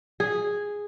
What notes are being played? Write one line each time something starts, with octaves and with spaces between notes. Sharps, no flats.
G#4